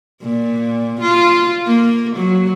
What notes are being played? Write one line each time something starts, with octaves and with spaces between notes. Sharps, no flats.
A#2
F4
A#3
F#3